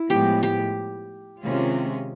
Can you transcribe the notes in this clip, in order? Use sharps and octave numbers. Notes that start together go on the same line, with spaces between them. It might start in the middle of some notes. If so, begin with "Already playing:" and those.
Already playing: E4
A2 F3 G#3 B3 G4
G4
C3 D#3 G#3 C#4 F4